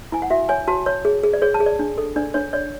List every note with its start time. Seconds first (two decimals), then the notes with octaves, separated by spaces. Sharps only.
0.12 E4 G#5
0.22 F#5
0.30 F#4 E5
0.49 C#5 G#5
0.68 F#4 A5
0.86 C#5
1.05 G#4
1.24 G#4
1.33 D5
1.42 G#4 C#5
1.54 A5
1.60 G#4
1.66 D5
1.79 D4
1.98 A4
2.16 D4 D5
2.34 D4 C#5
2.53 C#5 D5